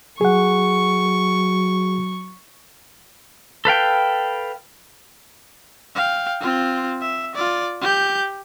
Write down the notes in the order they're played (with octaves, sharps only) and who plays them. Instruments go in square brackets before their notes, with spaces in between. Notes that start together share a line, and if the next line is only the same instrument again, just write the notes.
[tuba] F#3 [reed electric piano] G#4 F#5 [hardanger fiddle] C#6
[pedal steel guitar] A4 B4 F5 G5
[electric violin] F5 G5
C4 F4
E5
F4 D5
G4 G6